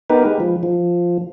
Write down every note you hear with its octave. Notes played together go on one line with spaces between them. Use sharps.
B3 D#4 G4 A#4 B4
G#3
F3
F3